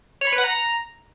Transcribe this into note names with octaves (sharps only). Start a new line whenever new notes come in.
C#5
B5
B4
F#5
A#5